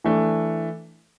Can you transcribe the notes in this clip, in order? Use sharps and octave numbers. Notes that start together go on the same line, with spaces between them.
E3 A3 D4